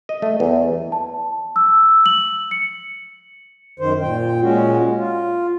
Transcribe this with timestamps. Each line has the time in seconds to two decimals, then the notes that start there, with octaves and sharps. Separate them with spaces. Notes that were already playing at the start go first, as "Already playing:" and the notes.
0.09 D#5
0.22 A3
0.40 E2
0.92 A5
1.56 E6
2.06 F#7
2.51 C#7
3.79 F#2 D#3 C5
4.01 A#2 G5
4.41 A#2 G#3 C#4 F#4
4.96 F4